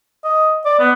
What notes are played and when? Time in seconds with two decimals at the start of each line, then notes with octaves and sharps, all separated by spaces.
0.24 D#5
0.65 D5
0.79 B3